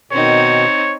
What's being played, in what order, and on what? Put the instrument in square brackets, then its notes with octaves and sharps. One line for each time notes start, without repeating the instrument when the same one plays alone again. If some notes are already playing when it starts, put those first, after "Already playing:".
[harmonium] B2 D#3 [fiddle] C4 D#4 [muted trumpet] C#5